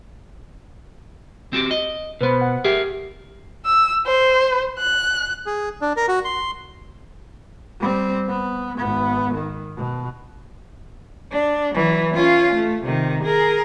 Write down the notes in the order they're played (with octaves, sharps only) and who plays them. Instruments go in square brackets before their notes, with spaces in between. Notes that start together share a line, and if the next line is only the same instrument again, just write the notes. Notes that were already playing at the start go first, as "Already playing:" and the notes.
[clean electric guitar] C4 F#4 G4
D#5
[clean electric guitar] B2 B3 [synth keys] B4 C5 B5
[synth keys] F#5
[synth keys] G4 [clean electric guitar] G#4 A#4 E5
[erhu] E6
C5
F#6
[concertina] G#4
D4
A#4
F#4
C6
[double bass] G3 C4
B3
G#1 B3
D#3
B2
[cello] D4
E3 F#3
C#4 F4
A3
C3 D#3
G#4 A#4